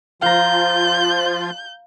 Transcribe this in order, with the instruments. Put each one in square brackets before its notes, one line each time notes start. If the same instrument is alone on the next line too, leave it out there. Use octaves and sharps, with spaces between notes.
[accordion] F3 F4 [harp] F5 A#5 [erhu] G6